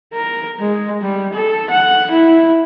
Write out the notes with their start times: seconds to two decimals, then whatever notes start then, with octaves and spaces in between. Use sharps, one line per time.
0.13 A#4
0.59 G#3
1.02 G3
1.33 A4
1.70 F#5
2.11 E4